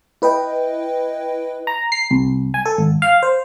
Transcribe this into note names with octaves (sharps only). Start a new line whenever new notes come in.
E4 B4 D#5 G5
A#5
C7
C2
G#5
A4
G#1
F5
C5